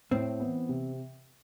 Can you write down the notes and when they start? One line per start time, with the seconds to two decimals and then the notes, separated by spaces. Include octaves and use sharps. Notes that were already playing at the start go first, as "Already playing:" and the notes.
0.11 A2 C4
0.40 E3 B3
0.69 C3